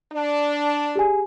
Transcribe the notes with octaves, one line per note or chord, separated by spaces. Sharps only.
D4
G4 G#4 G#5